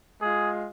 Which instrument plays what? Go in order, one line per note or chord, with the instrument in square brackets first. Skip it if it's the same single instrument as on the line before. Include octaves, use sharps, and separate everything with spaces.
[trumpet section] G#3 F4 G#4